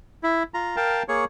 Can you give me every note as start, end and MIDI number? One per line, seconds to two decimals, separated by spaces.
0.23 0.43 64
0.54 0.76 65
0.54 0.76 82
0.76 1.03 70
0.76 1.03 77
0.76 1.03 79
0.76 1.03 81
1.08 1.25 58
1.08 1.25 68
1.08 1.25 73
1.08 1.25 85